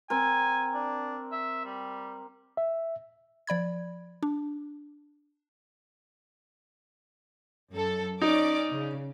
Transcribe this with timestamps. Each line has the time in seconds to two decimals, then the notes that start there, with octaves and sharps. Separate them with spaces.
0.10 C4 A#4 G#5
0.74 D4
1.32 E5
1.66 G3
2.57 E5
3.47 F3 D5 B5 G#6
4.23 D4
7.71 F#2 A4
8.21 C#4 D#4 D5 D6
8.71 C#3